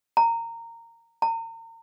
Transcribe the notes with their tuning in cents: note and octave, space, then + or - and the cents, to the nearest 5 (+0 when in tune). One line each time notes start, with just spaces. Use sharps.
A#5 -15
A#5 -35